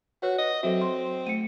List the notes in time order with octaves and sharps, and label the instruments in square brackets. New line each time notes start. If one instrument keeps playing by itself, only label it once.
[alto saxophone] F#4 [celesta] B4 C#5 F#5
[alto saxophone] D#5
[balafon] F#3 E5 [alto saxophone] C4 [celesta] F#4 A4
[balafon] C6
[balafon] A3 [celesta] C#7 D#7